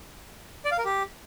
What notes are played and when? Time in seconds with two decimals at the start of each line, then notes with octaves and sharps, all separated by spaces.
0.65 D5
0.72 F5
0.78 A#4
0.85 G4